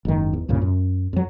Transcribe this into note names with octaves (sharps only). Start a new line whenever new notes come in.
F#1 G#2 D#3
E2
C2 G2 A#2 C#3
F#2
F2 F#3